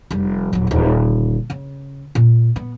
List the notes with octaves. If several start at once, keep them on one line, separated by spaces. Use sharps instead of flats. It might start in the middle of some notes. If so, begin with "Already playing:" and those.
F1 G3
D#1 F#3
D#1 D2
C#3
A#2
B3